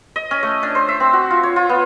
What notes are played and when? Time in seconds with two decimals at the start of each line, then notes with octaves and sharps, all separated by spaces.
0.16 D#5
0.31 C#4
0.43 A3
0.63 D4
0.75 C5
0.89 E5
1.00 C4
1.13 F#4
1.30 F4
1.43 C#5
1.56 F4
1.69 B3